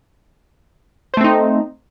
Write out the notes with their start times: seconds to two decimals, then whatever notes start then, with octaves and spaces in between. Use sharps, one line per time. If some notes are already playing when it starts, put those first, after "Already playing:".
1.14 C5
1.17 A3
1.21 C4
1.24 D#4